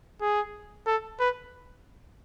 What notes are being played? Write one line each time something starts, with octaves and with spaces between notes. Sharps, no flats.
G#4
A4
B4